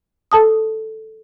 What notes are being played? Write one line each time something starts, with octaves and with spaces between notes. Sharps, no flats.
A4 A5 D#6